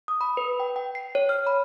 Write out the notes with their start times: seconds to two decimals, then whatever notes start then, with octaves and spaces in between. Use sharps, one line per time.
0.08 D#6
0.21 B5
0.37 B4
0.60 G5
0.76 G5
0.95 C7
1.15 C#5
1.29 F6
1.47 B5